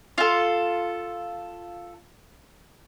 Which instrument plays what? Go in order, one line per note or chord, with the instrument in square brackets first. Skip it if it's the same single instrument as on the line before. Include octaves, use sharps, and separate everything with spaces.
[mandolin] F4 A4